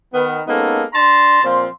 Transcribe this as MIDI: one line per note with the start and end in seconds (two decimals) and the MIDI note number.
0.13 0.40 51
0.13 0.40 59
0.13 0.40 71
0.47 0.83 56
0.47 0.83 58
0.47 0.83 59
0.47 0.83 61
0.47 0.83 63
0.47 0.83 69
0.94 1.42 62
0.94 1.42 81
0.94 1.42 82
0.94 1.42 84
1.44 1.68 46
1.44 1.68 53
1.44 1.68 60
1.44 1.68 84